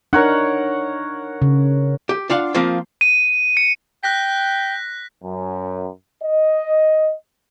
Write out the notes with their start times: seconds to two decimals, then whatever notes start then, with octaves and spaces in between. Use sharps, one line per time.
0.13 D4 D#4 A#4 C#5 F#5
1.42 C#3
2.09 G4
2.30 D4 F4 F5 F#5
2.55 F3 A#3 C4 F4
3.01 D#7
3.57 C#7
4.03 G5 F#6 A#6 B6
5.23 F#2
6.23 D#5